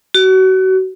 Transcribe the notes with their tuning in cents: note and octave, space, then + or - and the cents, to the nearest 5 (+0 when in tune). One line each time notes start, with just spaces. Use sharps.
F#4 +30